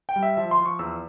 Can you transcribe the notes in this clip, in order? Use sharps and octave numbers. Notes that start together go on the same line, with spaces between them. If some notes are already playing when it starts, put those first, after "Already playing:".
G5
G3
E5
F3 E5
C6
F3
C#6
E2 E6